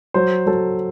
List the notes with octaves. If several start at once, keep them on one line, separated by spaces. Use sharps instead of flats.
F#3 C5
F#3 A4